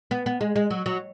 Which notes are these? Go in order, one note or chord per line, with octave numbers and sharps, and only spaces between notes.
B3
B3
G#3
G#3
F#3
F#3